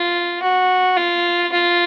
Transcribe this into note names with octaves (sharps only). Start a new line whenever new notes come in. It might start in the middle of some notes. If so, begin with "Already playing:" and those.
Already playing: F4
F#4
F4
F4